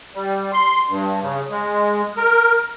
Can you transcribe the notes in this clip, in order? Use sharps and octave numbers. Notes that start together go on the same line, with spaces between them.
G3
C6
G2
C#3
G#3
A#4